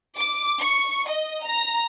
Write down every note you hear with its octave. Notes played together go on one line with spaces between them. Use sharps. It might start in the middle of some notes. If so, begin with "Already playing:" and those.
D6
C#6
D#5
A#5